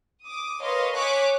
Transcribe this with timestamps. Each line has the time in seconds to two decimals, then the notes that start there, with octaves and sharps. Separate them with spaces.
0.23 D6 D#6
0.60 A#4 B4 C#5 D#5 F5 C6
0.93 C#5 G#5 C#6 D6 F#6 B6